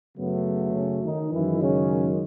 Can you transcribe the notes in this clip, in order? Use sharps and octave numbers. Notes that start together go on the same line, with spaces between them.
F#2 C#3 F#3 A3 B3
C#3 C#4
D#3 D#4
F#2 D#3 E3 G#3 E4
C#3 C#4